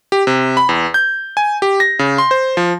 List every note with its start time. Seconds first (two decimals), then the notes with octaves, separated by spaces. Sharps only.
0.12 G4
0.27 C3
0.57 B5
0.69 E2
0.94 G6
1.37 G#5
1.62 G4
1.80 A#6
1.99 C#3
2.18 C6
2.31 C5
2.57 F3